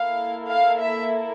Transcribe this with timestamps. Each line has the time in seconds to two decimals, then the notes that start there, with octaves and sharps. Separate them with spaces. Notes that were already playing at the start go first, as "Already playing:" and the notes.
Already playing: A#3 E4 A4 F5
0.50 F5
0.81 E5